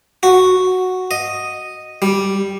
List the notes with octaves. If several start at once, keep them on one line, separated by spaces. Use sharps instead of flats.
F#4
D#5
G3